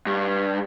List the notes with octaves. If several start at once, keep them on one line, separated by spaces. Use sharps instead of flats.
G2